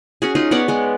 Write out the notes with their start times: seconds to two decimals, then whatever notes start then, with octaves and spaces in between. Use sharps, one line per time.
0.22 C#4 F#4 G#4
0.35 D#4 F4 G#4
0.51 B3 C#5 D5 F#5
0.68 G#3 B3